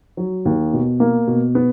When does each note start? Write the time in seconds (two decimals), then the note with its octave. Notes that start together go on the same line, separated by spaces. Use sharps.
0.17 F#3
0.45 D#2
0.73 B2
1.00 A#3
1.27 B2
1.55 B3